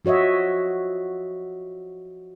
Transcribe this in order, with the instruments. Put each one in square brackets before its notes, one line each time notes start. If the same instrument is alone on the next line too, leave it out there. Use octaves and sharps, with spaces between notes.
[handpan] F3 F#4 C#5 D#5 E5